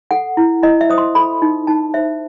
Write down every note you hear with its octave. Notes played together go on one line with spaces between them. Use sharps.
A4 F#5
E4
E4 D#5
E5
C5 D#6
C6
A4 B5
D#4
D#4 A5
C5 E5